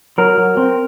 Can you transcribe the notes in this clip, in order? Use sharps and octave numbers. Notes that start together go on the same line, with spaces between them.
F#3 A#4
F#3
C4